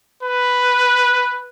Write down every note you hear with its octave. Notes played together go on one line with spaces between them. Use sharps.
B4